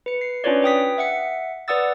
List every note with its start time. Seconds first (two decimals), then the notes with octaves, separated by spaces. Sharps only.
0.06 B4 C#7
0.21 C7
0.44 C#4 D4 F4 B4 C#5 D5
0.62 B4 G5 D#6 B6
0.98 E5 F#5 C#7
1.68 B4 D5 F#5 D#6 E6 A6